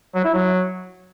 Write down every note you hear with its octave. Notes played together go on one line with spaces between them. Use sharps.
F#3
E4
F#3